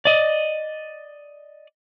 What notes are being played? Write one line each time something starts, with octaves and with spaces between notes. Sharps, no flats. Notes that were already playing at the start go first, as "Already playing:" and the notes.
D5 D#5